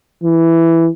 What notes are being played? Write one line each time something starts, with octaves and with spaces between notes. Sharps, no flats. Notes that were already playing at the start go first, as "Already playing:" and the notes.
E3